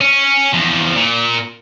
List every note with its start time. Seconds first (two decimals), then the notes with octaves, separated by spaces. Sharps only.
0.01 C#4
0.54 E2 F3
0.96 A#2